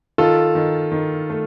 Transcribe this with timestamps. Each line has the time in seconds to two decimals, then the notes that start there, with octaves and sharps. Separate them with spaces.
0.18 D#3 F4 A4
0.55 D#3
0.92 D#3
1.30 A3